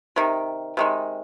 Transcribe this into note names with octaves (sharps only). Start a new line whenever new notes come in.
C3 D#3
C3 D#3 G#3